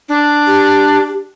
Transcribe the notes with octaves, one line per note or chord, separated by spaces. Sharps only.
D4
G4